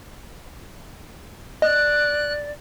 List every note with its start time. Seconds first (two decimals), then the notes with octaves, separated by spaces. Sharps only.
1.62 D5 D#5 F#6